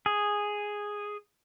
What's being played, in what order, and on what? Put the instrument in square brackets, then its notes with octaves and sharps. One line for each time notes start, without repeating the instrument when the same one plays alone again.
[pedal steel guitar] G#4